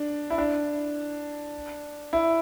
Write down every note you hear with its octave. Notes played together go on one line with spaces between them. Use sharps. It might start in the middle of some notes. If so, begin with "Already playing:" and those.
Already playing: D4
E4
D4
E4